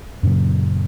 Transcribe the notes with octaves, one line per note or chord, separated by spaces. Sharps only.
F#2 A#2 C#3 F#3